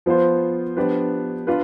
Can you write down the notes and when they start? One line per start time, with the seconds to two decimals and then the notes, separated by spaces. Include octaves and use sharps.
0.06 F3 B3 F4 C5
0.77 F3 B3 D4 G4 B4
1.47 D4 F4 B4